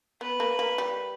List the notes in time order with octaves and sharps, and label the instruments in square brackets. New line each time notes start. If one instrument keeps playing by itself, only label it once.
[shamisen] B3 [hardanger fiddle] B4
[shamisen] A#3
A#3
G3